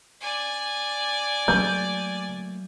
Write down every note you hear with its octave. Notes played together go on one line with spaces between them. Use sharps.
D5 G#5
F#3 A3 A#3 G6